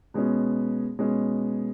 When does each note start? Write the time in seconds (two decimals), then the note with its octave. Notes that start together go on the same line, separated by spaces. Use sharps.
0.14 B2 G#3 C#4
0.99 B2 G#3 C#4